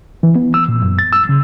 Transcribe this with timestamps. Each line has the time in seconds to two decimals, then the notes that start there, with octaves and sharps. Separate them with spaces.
0.23 E3
0.35 B3
0.54 E6
0.68 A#2
0.82 F#2
0.99 A6
1.13 E6
1.29 C#3